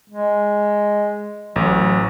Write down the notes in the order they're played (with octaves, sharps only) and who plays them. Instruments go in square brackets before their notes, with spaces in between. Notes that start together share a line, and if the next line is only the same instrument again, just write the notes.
[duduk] G#3
[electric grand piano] A1 [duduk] F#3